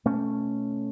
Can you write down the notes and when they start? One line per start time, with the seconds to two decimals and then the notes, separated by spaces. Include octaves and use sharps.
0.05 B2 A3 C#4